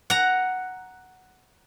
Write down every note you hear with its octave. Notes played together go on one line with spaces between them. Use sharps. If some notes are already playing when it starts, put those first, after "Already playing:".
F#5 A#5